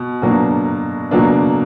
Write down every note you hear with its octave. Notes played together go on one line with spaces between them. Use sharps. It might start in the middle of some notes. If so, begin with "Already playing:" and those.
Already playing: B2
B2 F#3 A#3 D4
B2 F#3 A#3 D4